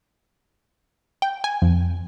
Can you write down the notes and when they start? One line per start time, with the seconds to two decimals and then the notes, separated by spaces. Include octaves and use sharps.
1.22 G5
1.44 G#5
1.62 F2